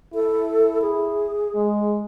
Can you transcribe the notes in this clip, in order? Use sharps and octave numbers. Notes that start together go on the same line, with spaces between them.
E4 A4
G#4
G#3